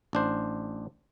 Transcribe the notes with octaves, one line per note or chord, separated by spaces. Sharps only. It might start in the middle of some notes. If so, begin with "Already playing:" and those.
A1 D4 C5